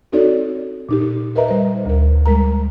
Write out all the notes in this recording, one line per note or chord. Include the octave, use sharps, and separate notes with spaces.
C4 D#4 F#4 A4 C#5 D5
A#2 D#4 G4
A#4 B4 D#5 E5 A#5
G3 C5
D2 A#4
G3 G#3 A#4 A#5